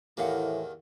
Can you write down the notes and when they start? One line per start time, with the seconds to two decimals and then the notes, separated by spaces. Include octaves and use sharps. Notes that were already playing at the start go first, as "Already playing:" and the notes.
0.17 E2 A2 D#3 E3 A#3 G4 F5 F#5